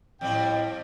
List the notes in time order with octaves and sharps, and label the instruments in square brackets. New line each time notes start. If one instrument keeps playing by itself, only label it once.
[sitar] F2 G3 C4 [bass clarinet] A2 [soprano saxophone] G5